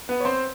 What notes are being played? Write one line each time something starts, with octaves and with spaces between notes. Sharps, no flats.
B3 B4
C#5
C4 C5